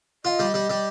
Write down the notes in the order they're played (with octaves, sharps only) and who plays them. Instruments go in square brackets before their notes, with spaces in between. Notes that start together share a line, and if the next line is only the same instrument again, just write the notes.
[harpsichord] F4 [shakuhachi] D#5
[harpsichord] G3
G3
G3